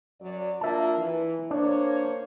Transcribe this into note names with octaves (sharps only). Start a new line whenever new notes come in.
F#2 F#3 D5
A#3 D4 F4 E5 A5
E3
A#3 D4 C5 C#5